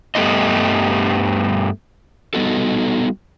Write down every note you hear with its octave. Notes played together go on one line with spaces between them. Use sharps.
G2 G3 A3 B3 F4 D#5
G3 B3 D#4 F#4 A4